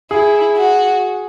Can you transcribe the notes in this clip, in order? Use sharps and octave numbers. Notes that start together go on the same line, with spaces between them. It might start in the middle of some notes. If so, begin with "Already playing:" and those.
E4 G#4
F#4